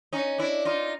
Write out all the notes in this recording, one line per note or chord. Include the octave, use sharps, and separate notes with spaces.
C#4 D#4
D4 E4
D#4 F4